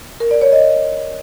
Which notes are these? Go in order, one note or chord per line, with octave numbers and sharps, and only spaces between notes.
A#4
D5
C#5
D#5